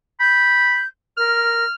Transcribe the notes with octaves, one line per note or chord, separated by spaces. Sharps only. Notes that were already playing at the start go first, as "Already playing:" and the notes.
B5 G6
A#4 F6